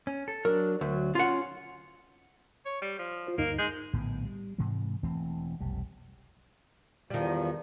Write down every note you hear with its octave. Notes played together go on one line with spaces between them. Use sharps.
C#4
A4
F#3 D4 A#4
D2 F#3
C#4 F4 F#5
C#5
G3
F3
F4 C5
D2 G2 A#3 D#4
G#3 G6
A#1 A2 D3 B3
G3
G#2 C3 E3 G#3
E1 E3 A3 C4
F1 B1 G3
E2 D#3 F3 G3